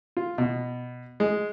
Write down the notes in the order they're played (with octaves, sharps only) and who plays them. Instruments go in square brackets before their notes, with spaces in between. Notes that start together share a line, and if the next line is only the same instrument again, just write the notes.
[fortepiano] F4
B2
G#3